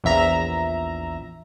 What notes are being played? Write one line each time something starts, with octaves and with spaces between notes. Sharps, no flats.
A#1 E2 E5 A#5